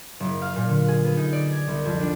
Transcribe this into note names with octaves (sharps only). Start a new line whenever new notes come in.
F#1
F5
A#2
D3
G#4
B3
D#4
D5
G#6
C2
F2
D4